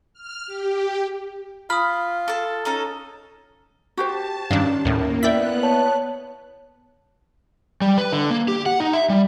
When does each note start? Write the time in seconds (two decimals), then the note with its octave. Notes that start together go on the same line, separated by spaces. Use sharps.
0.13 F6
0.47 G4
1.70 F4 B5 D#6 F6
2.28 A4 A5
2.65 C#4 D#4 A4
3.97 F#4 G4 C5 A5
4.51 G2 D#3 C#4 D4 F5
4.85 D#2 A2 A#3
5.23 B3 E4 D5 E5 G5 F#6 B6
5.63 C#5 A5
7.81 G3
7.98 B4
8.12 D3
8.30 A#3
8.48 G4
8.66 F#5
8.80 D#4
8.93 E5
9.10 G3